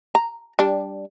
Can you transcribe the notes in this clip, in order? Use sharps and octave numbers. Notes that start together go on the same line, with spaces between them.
A#5
G3 D4